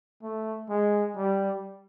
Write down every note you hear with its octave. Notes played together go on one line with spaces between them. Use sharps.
A3
G#3
G3